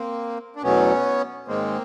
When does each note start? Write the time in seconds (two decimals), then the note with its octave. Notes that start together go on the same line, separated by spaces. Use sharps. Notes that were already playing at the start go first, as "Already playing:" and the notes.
Already playing: A#3 C4
0.56 D4
0.63 E2 B2 F#3 A3 B3 C#4
1.48 G#2 D#3 G#3 A#3 C4